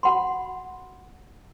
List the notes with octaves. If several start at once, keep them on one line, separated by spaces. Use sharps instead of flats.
F#4 F#5 B5 C6